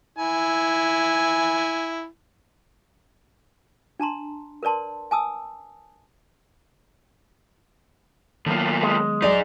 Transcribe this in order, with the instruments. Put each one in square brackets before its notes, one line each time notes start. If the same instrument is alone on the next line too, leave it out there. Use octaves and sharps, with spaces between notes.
[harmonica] E4 G#5
[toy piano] D4 A5 A#5 C6
A#4 B4 D5 A5 C6
G#5 A5 D#6 E6
[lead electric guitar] A2 A#3 [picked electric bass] D#3 F#3 B3
[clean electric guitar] G#3
[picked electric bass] D#1 F#3 [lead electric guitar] D#4 G#4 [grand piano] D5